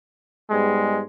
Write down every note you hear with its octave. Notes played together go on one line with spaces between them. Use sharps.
G#2 G3 G#3 B3